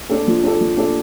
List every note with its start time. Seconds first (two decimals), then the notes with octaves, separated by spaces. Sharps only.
0.10 D4 A4
0.28 F3
0.43 D4 A4
0.61 F3
0.77 D4 A4